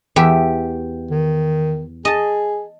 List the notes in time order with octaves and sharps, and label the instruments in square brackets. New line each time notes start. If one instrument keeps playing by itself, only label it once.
[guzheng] E2 G4 E5
[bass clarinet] D#3
[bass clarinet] G#4 [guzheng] D#5 A5